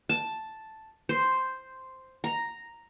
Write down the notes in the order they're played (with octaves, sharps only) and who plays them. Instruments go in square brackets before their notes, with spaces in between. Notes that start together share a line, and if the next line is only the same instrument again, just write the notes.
[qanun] A5
C5
A#5